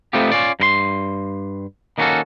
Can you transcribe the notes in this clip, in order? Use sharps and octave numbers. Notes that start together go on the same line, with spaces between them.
A3 B3 C4 D#4 F4 G4
C#4 F4 D5
G2 A#4 C6
D#3 A#3 B3 C#4 F#4 A4